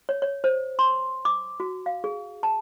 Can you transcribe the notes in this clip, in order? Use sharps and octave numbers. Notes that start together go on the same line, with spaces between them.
C#5
C#5
C5
C6
D6
F#4
F5
G#4
A5